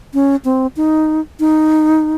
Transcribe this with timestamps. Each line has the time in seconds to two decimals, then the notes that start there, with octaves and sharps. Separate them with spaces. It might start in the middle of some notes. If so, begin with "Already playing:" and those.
0.14 C#4
0.45 C4
0.77 D#4
1.40 D#4